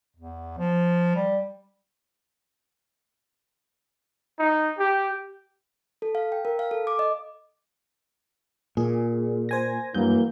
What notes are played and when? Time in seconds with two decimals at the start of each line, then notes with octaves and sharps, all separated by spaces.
0.16 E2
0.58 F3
1.16 G3
4.39 D#4
4.79 G4
6.02 A4
6.15 F5
6.32 G5
6.45 A#4
6.59 F5
6.71 A4
6.87 D6
6.99 D#5
8.77 A#2 G#4
9.49 C5 G#5 A#6
9.95 G2 E3 F#3 A#3 G6